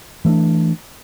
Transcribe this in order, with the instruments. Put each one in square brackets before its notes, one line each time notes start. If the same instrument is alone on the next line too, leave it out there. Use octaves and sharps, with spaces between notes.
[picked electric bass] E3 A3 D4